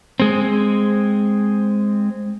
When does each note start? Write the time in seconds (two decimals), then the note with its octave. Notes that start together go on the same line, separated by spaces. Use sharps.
0.20 G#3 C4